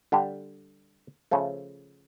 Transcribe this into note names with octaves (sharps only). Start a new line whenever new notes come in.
D3 G3 D4 G4
C#3 F3 A3